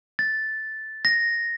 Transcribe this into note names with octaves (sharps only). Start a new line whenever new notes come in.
A6
A#6